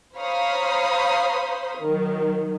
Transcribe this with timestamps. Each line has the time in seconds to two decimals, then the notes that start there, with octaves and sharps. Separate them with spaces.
0.18 C5 C#5 F5 A#5 B5 D#6
1.82 D#3 F#3